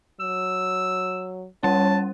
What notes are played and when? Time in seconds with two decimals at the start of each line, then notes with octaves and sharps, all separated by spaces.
0.20 F#3 E6
1.63 G3 C#4 C#5 A5